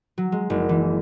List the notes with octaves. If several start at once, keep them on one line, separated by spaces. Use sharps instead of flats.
F#3
G#3
F#1
E3